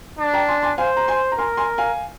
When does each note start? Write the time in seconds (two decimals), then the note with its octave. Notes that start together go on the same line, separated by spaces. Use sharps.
0.19 D4
0.34 G5 A#5
0.48 G#5 C6
0.63 G#5 C6
0.78 C5 F5 G#5
0.97 A#5
1.08 G#5 C6
1.32 A#5
1.38 A#4 G#5 C6
1.57 G#5 C6
1.78 F5 G#5